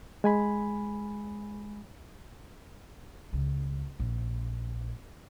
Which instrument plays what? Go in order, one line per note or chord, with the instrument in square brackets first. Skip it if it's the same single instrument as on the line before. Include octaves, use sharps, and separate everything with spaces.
[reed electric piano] G#3 G#5 B5
[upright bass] C#2
A#1